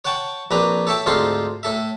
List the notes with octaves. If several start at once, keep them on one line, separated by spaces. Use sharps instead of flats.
C#5 F#5 G5 A5 C#6
A#1 C4 D4 B4 A#5
A4 C#5 E5 G5 A5
D2 G#2 C4 F4 A4 C6
A2 A4 E5